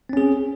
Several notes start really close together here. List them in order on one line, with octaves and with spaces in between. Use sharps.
C4 C#4 G#4